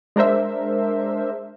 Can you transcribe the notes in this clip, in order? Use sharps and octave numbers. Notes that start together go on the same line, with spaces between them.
G#3 D4 A#4 C5 E5